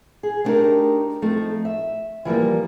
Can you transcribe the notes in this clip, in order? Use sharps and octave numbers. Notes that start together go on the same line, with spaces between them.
G#4
A3 B3 D4 D#4 G4 A#4
F3 A3 C4 D#4
E5
E3 F3 G3 A#3